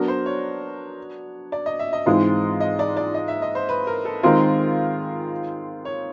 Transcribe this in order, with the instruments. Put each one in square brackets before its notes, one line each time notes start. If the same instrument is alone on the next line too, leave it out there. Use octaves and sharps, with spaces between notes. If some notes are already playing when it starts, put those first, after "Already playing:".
Already playing: [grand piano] F#3 B3 D4 F#4 [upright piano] A#4
[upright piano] C5
C#5
D5
D#5
E5
D#5
[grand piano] G#2 E3 G#3 C4 F4
[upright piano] D#5
D5
D5
D#5
E5
D#5
C5
B4
A#4
A4
[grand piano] D#3 G#3 C4 F4 [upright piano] A#4
[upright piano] C#5